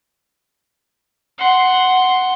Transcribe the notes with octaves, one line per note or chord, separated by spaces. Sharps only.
F#5 C6